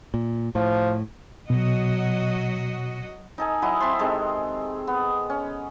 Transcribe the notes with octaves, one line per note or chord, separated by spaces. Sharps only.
A#2
A2 F3
B2 F#3 F#4 D#5
D#4 A4 G#5
F#3 E4 D#5
C4 E5 A5 C6
C3 D#3 G#3 A4
B3
C#4